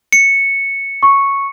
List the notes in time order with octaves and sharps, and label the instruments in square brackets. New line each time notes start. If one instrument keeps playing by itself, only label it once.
[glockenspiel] C#7
[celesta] C#6